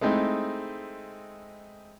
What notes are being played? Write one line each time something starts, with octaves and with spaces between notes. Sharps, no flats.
G#3 A3 C4 D#4 E4